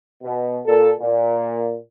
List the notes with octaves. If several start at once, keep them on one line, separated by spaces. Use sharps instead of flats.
B2
A#2 A4
A#2